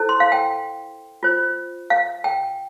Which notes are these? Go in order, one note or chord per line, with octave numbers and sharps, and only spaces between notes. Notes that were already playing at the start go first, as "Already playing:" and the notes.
Already playing: E4 A4 C5
C6
F5
G5
F4 C5
F5
G5